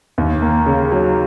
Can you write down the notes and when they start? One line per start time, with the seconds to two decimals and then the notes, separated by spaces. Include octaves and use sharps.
0.18 D#2
0.42 A#3
0.66 C#3
0.92 F#3